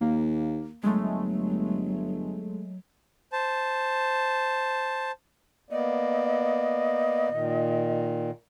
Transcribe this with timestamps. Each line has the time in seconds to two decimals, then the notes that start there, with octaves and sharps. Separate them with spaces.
0.01 D#2 A#3
0.83 G1 F#3 G#3 A3
3.33 C5 A5
5.70 A#3 B3 D5 D#5
7.29 A#2 D#3